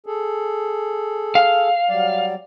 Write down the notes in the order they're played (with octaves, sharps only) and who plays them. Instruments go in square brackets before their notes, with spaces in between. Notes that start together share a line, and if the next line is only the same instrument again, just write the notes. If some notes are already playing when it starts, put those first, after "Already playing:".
[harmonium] G#4 A4
[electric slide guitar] F5
[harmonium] F#3 G3 D5